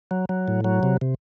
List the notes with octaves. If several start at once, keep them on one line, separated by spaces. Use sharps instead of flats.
F#3
F#3
A2
F#3
C3
C3